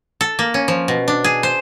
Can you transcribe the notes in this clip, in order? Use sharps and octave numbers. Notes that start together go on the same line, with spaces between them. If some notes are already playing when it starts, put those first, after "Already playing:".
A4
A#3
C#4
F3
B2
D4
G#4
C5